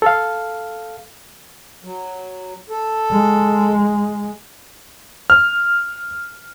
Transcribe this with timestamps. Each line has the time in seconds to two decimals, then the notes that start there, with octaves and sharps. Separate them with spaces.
0.02 A4 F5
1.84 F#3
2.70 A4
3.11 G#3
5.30 F6